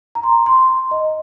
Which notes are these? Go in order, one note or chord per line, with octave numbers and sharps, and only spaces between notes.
A#5
C6
C6
D#5